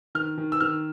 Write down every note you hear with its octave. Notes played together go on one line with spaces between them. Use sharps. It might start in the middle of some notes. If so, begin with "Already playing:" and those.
D#3 F6
D#3
E6
D#3 F6